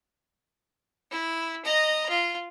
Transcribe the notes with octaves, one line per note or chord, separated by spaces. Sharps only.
E4
D#5 A#5
F4